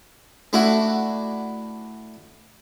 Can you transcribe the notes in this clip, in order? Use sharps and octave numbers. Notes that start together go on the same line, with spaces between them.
A3 D4 E4 F#4